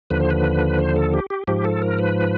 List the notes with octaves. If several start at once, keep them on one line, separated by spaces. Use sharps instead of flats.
D#2 D3 F3 B4
C5
B4
C5
A4
G4
G4
G#2 F3 G4
A4
A#4
B4